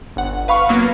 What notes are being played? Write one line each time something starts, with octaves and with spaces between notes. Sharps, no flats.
G1 F#5
B4 F5 B5 C#6
F#3 A#3 B3